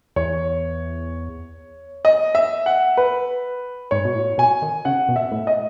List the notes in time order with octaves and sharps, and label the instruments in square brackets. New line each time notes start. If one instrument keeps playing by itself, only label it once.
[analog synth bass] E2 [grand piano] C#5
[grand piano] D#5
E5
F#5
B4
[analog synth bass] G#2 [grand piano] C#5
[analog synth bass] B2
A2
[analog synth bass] B2 [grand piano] G#5
[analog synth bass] D#3
[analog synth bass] C#3 [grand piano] F#5
[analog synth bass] B2
[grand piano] E5
[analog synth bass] A2
[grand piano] D#5